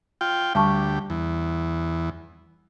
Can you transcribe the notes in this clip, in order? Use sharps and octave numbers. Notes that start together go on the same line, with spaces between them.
F4 G5
D2 G3 G4 A5 C#6
E2